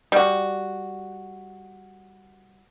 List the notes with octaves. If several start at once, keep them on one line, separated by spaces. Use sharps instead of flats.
G3 F#4